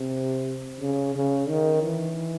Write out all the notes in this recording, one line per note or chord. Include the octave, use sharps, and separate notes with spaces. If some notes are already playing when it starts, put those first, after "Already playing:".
Already playing: C3
C#3
C#3
D#3
E3